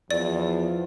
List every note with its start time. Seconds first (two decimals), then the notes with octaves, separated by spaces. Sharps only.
0.11 E2 F3 D5